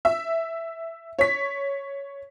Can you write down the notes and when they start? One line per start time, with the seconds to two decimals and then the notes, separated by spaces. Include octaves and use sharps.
0.05 E5
1.19 C#5 B6